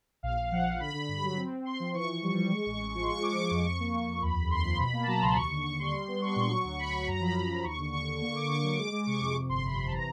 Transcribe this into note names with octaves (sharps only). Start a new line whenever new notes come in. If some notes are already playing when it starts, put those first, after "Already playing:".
A#1 F5
A#1
F3 F#5
A#1
D3 B5
D3
G2
F#3
C4
C4
C4 C6
F3
E3 C#6
E3
G3
G3
G#3
A1
G#3
F3
C6
G#3 C#6
G#3 D6
G#3 D6
F2
F2 C#6
A#3
A#3
F2
D#2 B5
D#2 B5
D#2 C6
F3 C6
B2 B5
A#3
A5
F#3 A#5
C#2 C6
D#2 C#6
D3
D#2 C#6
G3 C6
G3
B3
D4 C#6
A#2 C6
C#6
F#3
D2
F#3 B5
F#3
F#2 A#5
F3 B5
F#2
F3
D#2 C#6
D3
D3 C#6
D3
A#3 C#6
D3 D6
D6
D3 C#6
F#3
G#3 D6
G#3
C3 C#6
F2 D6
C3
G1 C6
G1 B5
C3
A5
E3 A#5